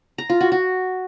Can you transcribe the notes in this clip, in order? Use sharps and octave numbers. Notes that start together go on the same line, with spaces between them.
A#5
F4
F#4
F#4